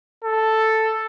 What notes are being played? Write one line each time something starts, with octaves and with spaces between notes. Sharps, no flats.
A4